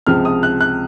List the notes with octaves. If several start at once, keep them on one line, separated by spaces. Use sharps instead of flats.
C#2 C3 F3 G#3 F6
D#6
F#6
F#6